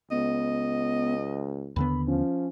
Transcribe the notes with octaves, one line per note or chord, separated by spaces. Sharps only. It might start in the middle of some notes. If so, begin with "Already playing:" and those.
C#2 B3 D#5
D#2 D3 B3 B5
F3 C#4